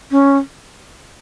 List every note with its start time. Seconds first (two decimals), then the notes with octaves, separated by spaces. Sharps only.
0.11 C#4